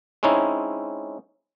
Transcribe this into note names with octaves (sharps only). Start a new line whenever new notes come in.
G#3 C4 C#4 D#4 E4